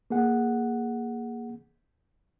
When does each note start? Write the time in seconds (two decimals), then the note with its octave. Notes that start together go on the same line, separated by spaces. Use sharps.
0.10 A#3 G#4 F#5